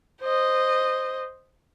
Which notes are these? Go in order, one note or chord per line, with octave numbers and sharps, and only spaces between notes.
C5 D#5